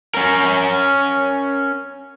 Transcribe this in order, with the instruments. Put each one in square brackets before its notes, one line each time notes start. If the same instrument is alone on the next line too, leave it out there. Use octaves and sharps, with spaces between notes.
[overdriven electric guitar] C#4 A#4